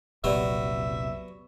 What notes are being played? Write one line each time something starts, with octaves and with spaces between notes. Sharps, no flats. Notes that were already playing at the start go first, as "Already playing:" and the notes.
F1 C2 A#2 F#3 B3 G4 D5 E5